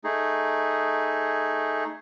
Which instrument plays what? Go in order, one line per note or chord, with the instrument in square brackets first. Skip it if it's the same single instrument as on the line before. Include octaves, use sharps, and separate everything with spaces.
[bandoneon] A3 D#4 G#4